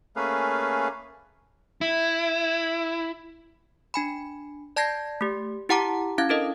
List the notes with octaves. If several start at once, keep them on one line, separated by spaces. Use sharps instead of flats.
A3 A#3 C#4 G#4 B4 F5
E4
D4 G#5 B5
D5 A5 G6 G#6 A#6 C7
A3 G4
E4 G4 F#5 A5 A#5 D6
C#4 E4 F5 G#6
D4 E4 A4 A#4 D#5